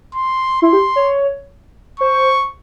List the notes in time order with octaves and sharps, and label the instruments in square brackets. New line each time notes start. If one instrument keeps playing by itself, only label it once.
[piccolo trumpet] C6
[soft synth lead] E4 [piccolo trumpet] C6
[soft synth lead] G4
C#5
[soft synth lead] C5 [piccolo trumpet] C#6